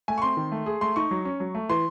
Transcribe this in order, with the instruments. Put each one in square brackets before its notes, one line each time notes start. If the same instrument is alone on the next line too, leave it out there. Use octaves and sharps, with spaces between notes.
[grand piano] A3 [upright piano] G#5
[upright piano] C#6
[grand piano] C4 [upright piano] C6
[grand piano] D#3
A3
G#4
[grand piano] A3 [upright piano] C6
[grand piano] D#4 [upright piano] C#6
[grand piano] F#3
C#4
F#3
A3
[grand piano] E3 [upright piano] C6